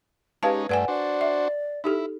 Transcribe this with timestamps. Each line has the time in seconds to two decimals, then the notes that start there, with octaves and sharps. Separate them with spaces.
0.43 G#3 C#4 D#4 G4 B4 F5 A5
0.69 G2 A3 B4 D5 F#5 G#5
0.88 D4 F#4 C5 D5
1.21 E5
1.84 D#4 E4 G4 A4